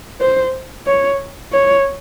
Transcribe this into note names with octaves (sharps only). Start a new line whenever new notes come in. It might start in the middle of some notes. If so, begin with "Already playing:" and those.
C5
C#5
C#5